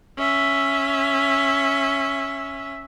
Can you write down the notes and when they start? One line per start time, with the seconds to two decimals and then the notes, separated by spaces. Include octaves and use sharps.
0.18 C#4 E5